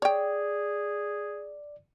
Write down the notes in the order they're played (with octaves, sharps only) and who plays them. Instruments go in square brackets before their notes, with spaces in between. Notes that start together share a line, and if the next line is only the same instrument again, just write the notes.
[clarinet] G#4 [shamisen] C#5 G5 [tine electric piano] D5